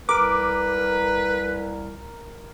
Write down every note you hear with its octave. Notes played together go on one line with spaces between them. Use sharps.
C2 A#4 B4 D6